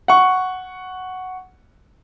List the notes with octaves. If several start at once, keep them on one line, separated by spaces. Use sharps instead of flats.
F#5 C#6